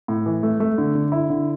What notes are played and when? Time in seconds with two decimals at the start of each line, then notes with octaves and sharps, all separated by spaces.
0.08 A2
0.26 E3
0.43 A3
0.60 A3
0.78 D3
0.95 D3
1.12 E4
1.30 D3